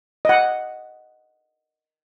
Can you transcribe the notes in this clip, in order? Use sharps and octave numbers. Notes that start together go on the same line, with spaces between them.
D#5 F#5